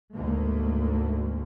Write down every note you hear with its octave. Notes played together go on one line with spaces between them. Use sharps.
D2 G#2 A3 A#3